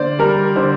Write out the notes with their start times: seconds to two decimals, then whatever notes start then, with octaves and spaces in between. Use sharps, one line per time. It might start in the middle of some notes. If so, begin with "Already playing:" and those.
Already playing: D3 A#3 C5 D5
0.19 G3 A#4
0.56 D3 C5